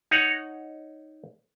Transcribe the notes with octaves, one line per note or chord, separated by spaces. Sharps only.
D#4 C#5 F#5